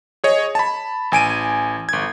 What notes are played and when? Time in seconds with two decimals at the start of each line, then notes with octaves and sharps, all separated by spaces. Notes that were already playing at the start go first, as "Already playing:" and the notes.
0.24 G#4 C#5 D#5
0.55 A5 B5
1.12 A1 G#5 D7 D#7
1.89 G1 G#6